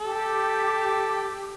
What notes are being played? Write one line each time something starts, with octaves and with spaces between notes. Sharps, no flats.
G4 A4